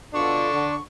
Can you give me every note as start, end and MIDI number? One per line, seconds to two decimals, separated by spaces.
0.14 0.46 47
0.14 0.46 50
0.14 0.74 62
0.14 0.46 65
0.14 0.74 69
0.14 0.81 85
0.52 0.75 50